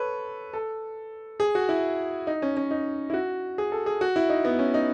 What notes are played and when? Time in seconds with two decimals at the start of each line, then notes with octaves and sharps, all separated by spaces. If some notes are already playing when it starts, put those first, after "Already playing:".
Already playing: A4 B4 C#5
0.53 A4
1.40 G#4
1.55 F#4
1.69 E4
2.27 D#4
2.42 C#4
2.57 C#4
2.71 D#4
3.10 E4
3.14 F#4
3.58 G#4
3.72 A4
3.86 G#4
4.01 F#4
4.16 E4
4.29 D#4
4.45 B3
4.59 C#4
4.74 D#4